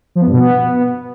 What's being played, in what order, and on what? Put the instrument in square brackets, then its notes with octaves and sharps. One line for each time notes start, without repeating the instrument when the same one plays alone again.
[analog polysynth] F3
B3
G2
B2
B3